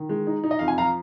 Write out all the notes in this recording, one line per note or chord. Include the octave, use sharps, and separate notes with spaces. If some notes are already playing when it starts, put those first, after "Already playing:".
Already playing: D#3
G#3
D#4
D#4
D#5
F2 F5
G#5
F3 F5 A#5